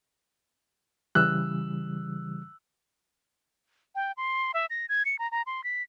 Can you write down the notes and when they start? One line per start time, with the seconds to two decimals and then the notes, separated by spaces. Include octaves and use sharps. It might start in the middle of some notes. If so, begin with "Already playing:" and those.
1.15 C#3 E3 G3 E6 F#6
3.95 G5
4.17 C6
4.54 E5
4.70 A#6
4.89 G#6
5.05 C#7
5.19 A#5
5.31 A#5
5.46 C6
5.64 B6